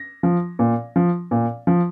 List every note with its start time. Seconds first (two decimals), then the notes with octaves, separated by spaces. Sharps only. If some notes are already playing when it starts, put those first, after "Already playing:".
Already playing: A#6
0.23 F3
0.59 A#2
0.96 F3
1.31 A#2
1.67 F3